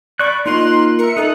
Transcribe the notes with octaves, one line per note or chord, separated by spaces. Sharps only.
D5 B5 C#6 F#6
A#3 D#4 F4 C6 F#6
A#4 E5 C#7
D#4 A4 D#6 F#6